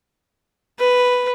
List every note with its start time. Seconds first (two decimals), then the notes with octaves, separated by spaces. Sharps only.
0.79 B4